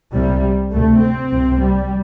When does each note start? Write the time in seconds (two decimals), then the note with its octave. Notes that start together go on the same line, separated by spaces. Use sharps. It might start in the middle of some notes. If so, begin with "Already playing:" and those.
0.13 C2 C3 G3
0.72 D2 C3 A3
1.02 C4
1.31 C2 C3
1.61 G3